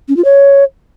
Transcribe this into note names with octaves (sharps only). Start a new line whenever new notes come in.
C#4
F4
C#5